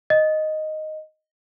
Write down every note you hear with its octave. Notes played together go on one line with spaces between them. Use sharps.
D#5